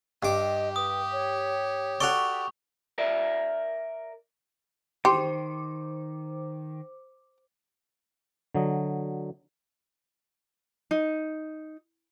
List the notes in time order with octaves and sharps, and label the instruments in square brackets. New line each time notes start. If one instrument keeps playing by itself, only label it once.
[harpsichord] G2 D6 [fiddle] G4 [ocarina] D#5
[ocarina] B4 [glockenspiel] D#6
[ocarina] C#5
[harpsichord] F#4 A4 D5 [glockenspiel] C#6 F7
[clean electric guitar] A#4 D5 E5
[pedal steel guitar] D#3 [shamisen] G4 [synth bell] C5 D6 [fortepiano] C6
[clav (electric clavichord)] D3 F#3 D#5
[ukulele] D#4